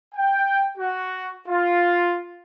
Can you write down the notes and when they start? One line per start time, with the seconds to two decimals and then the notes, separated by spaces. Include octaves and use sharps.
0.15 G5
0.77 F#4
1.48 F4